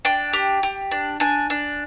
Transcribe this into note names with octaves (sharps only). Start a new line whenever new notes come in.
D4 G5
G4
G4
D4
D4 G#5
D4